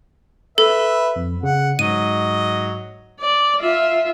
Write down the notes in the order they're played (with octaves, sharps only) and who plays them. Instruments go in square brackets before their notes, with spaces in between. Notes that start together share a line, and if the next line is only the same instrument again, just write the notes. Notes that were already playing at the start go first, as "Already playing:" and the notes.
[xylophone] A4 [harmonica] B4 E5
[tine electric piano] F2
[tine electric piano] C#3 [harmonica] F#5
[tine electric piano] G#2 [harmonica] F#3 D#5 [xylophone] D#7
[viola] D5
F4 E5